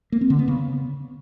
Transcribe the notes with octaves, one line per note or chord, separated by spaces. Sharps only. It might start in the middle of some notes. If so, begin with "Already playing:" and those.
A#3
C4
D3
B3
C#3